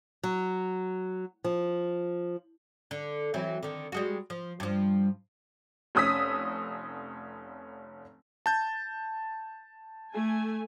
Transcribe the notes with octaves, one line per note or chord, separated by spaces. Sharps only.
F#3
F3
D3
E3 F#3 C4
D3 D#3
G3 G#3 F#4
F3
G2 F3
F1 C#4 D#6 E6 B6
A5 G6 A6
A3 G#5